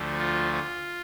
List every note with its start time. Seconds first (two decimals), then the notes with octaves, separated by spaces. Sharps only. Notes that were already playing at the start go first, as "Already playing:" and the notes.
Already playing: D2 D3 F3 A3
0.19 F4
0.53 F4